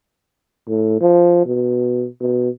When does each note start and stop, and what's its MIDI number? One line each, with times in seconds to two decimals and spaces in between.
0.68 0.97 45
1.01 1.43 53
1.46 2.06 47
2.21 2.50 47